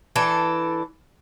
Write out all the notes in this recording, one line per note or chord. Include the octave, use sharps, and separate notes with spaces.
E3 D4 A4